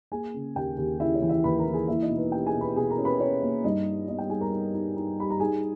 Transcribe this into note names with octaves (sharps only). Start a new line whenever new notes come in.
A#3 G#4 G#5
C#3
D#2 G4 G5
D#2
C#3 E4 E5
C#4 C#5
E3
E4 E5
D#2 B4 B5
A#4 A#5
E3
G#4 G#5
A#3 E4 E5
D#4 D#5
B2
B4
C#4 G4 G5
G#4 G#5
B2
B4 B5
B2 G#4 G#5
A#4 A#5
C#4
B4 B5
C#4 C#5
A#3
G2 D#4 D#5
G3
B3 D#4 D#5
G4 G5
D#4 G#4 G#5
A#4 A#5
D#4
D#4
D#4
G3 B5
A#5
D#4 G#4 G#5